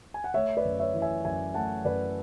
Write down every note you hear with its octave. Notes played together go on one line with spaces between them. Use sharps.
G#5
F#5
A3 C#5 E5
B4 D5
F#2
C#5 E5
E3
E5 G#5
F#2 E5 G#5
A3 F#5 A5
F#2 B4 D5